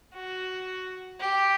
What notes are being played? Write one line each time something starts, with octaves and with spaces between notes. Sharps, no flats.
F#4
G4